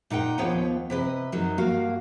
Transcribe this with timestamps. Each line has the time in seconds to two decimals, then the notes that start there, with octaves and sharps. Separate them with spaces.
0.10 A#2 D#4 F#5 G5
0.38 D#2 F3 B3 F4 C#5 G5
0.90 C3 B4 D5 D#5
1.32 F#2 F#3 D#4
1.58 G2 A#3 F#4 F5